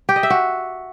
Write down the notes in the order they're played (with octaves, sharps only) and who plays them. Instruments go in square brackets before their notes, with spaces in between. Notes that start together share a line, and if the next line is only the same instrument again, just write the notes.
[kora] G4
D#5
E5
F#4